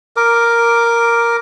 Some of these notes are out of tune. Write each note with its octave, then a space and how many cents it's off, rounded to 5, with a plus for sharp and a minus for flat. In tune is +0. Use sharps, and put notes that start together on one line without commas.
A#4 +0 D6 +0